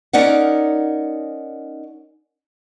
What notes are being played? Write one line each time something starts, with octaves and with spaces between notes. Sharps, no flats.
C#4 D#4 A#4 D5 F#5